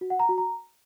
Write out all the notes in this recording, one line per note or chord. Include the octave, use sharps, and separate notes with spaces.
F#4
F#5
A#5
F#4
A#5